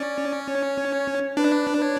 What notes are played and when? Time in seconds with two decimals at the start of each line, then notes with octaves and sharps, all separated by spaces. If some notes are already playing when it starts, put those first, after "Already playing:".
Already playing: C#4 D5
0.47 C#5
1.37 D4 B4
1.77 B4
1.82 C#5